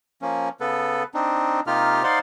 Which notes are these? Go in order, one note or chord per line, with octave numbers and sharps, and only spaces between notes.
F3 A#3 C#4
C#3 B3 A4 B4
C4 D4 D#4
C3 A#3 D#4 F4 G4 F6
D#4 C5 D5 F5 F#5 C6